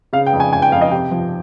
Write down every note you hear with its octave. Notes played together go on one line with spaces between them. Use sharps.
C#3 F5
G5
F2
G#5
F2 G#5
G5
F2 F5
D#5
C3 G5
F3